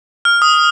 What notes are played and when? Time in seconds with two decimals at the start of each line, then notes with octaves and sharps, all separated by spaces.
0.25 F6
0.42 D#6